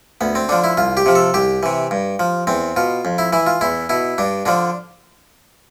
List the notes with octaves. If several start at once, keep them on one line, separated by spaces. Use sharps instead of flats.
D2 B3
C4
D3 F3 D4
E4
C2 F4
G4
C3 F3
A4
C2 G4
C3 E3
G2
F3
E2 C4
B2 F4
F2
E4
E3 E4
F4
E2 E4
B2 E4
G2 D4
D3 F3 D4